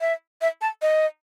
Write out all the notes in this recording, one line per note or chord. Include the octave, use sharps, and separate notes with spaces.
E5
E5
A5
D#5